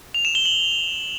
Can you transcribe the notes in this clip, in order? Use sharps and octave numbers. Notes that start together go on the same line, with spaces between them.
F7
E7
G7
F#7